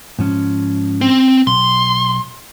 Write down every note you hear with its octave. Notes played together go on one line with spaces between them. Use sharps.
G#2 F3 C#4
C4
B1 C6